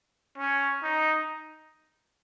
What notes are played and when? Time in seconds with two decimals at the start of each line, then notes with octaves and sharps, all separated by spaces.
0.38 C#4
0.83 D#4